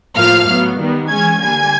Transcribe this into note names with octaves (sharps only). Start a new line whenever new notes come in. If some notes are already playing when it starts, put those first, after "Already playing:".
A2 F3 A#3 F5 F6
A2 F#3 B3
D#3 G3 B3
E3 G#3 C#4 G#5 G#6
D3 G3 A#3 G#5 G#6